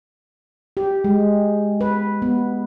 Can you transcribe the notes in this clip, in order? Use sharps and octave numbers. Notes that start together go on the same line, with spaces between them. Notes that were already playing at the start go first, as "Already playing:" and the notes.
G4
G#3
B4
B3